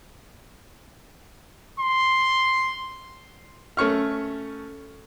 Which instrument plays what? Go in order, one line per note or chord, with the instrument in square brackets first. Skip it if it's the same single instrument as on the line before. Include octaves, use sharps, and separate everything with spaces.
[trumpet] C6
[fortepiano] A3 C#4 C#6 F6